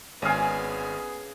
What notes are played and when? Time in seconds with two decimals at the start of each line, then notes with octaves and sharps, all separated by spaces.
0.22 G#1 C#3 B3 G#4 G#5 F6